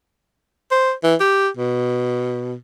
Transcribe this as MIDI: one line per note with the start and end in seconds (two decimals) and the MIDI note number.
0.71 0.92 72
1.03 1.15 52
1.20 1.48 67
1.57 2.54 47